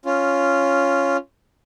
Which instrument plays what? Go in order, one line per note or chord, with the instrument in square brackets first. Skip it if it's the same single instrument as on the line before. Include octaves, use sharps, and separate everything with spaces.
[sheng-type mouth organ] C#4 F4